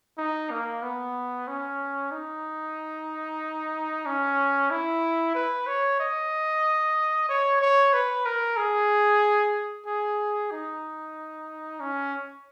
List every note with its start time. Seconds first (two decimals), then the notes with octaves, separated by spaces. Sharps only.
0.18 D#4
0.51 A#3
0.83 B3
1.47 C#4
2.12 D#4
4.06 C#4
4.71 E4
5.35 B4
5.67 C#5
6.00 D#5
7.29 C#5
7.61 C#5
7.94 B4
8.26 A#4
8.57 G#4
9.86 G#4
10.51 D#4
11.80 C#4